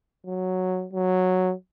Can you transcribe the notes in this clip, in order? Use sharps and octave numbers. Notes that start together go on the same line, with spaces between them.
F#3
F#3